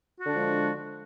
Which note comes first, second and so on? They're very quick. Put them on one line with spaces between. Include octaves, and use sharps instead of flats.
F#4 D3 D4 G#3 F3